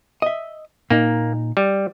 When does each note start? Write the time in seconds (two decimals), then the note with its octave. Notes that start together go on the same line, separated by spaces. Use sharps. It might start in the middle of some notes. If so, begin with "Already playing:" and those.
0.22 D#5 E5
0.90 A#2 A#3 D#4
1.57 G3